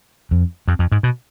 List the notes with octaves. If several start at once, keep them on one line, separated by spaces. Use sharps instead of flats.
F2
F2
F2
G#2
B2